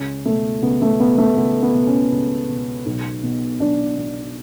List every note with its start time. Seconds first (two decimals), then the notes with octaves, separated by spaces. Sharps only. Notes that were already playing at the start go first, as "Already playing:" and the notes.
Already playing: C#2 C#4
0.26 B2 A3
0.62 C#2 B3
0.82 A3
0.99 B2 B3
1.18 A3
1.37 C#2 B3
1.62 B3
1.74 B2
1.87 C#4
2.12 C#2
2.49 B2
2.86 B1
3.23 B2
3.60 B1 D4
3.97 B2